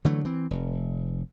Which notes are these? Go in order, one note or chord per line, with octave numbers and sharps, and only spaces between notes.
D3 E3 F#3 A3
E3 C4
F1